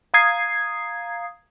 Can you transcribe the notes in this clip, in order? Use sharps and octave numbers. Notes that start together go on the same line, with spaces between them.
F5 A#5 D#6 G#6 C7